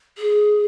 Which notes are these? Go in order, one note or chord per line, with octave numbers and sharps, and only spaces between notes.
G#4